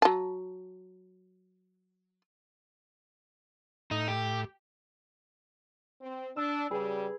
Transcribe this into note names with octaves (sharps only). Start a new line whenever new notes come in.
F#3 A5
A2 D#4
G4
C4
D4 E6
C#3 G3 G#4 B4